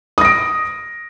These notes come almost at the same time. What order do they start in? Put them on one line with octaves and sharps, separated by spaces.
D#6 A#6 D7